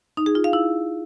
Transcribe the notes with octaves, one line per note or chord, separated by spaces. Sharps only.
D#4
G#4
F4
F5
E4